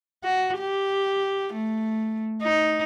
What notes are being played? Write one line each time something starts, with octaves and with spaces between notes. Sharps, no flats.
F#4
G4
A3
D#4